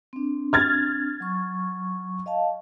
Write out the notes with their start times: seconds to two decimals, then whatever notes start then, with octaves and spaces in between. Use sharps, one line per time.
0.13 C4 D4
0.53 F6 G#6 A6
1.20 F#3 C#6
2.26 D#5 F5 A5